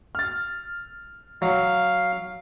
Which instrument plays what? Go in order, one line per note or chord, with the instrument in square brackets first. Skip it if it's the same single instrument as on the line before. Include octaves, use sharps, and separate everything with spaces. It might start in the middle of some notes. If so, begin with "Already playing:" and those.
[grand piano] F6 A6
[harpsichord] F#3 [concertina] F5